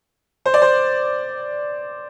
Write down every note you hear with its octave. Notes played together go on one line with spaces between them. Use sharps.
C5
D5
C5